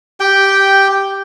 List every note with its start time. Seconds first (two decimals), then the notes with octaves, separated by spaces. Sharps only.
0.20 G4 G5